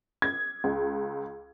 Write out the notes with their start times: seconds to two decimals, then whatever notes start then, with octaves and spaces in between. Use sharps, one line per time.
0.22 G#6
0.64 C#2